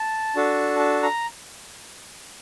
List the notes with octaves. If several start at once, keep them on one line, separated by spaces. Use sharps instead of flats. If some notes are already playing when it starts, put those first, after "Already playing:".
Already playing: A5
D4 F#4 A4
A5
A#5